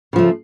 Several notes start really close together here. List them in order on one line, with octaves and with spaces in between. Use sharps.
C#3 F3 A3